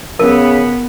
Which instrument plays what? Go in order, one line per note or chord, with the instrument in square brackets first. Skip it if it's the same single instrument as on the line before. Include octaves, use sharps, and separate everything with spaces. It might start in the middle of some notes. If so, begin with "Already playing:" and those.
[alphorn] C#3 [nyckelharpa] B3 [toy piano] A#4